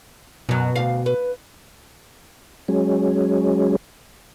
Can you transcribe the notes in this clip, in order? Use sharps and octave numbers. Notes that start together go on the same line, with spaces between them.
F#2 B2 F#3
D2 F5
B4
F#3 G#3 C#4